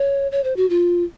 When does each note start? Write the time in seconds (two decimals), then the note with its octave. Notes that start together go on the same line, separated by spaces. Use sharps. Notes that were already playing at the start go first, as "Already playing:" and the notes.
Already playing: C#5
0.32 C#5
0.44 C5
0.56 F#4
0.70 F4